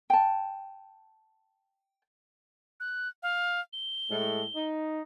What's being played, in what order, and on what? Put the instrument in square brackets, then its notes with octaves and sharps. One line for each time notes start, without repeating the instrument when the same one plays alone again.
[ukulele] G5 A5
[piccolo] F#6
F5
G7
[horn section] A2 G#3 A3
D#4